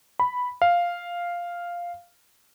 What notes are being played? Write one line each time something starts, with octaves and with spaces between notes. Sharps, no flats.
B5
F5